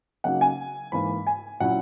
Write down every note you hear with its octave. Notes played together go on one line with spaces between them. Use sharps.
C#3 F#3 A#3 D#4 F#5
G#5
G#2 E3 A#3 B5
G#5
A#2 F#3 C#4 E4 F#5